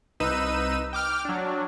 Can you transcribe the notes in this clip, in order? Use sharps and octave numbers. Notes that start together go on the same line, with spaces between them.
C2 D#4 B4 E6 D#7
G5 D6 F6
F#3 D4